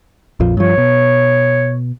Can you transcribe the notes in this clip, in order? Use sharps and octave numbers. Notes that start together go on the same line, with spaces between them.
A#1 F2 F3
G2 F3 C#5
B2